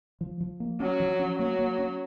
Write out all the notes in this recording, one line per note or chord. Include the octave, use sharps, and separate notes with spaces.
F3
F3
A#3
F#3 C#4
F3
C#4
F#3 A#3
A#3
C#4